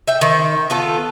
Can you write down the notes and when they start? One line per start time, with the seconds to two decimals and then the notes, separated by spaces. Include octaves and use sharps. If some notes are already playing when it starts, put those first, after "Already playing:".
0.08 E5 G5
0.21 D#3 C5
0.70 B3 F4 A4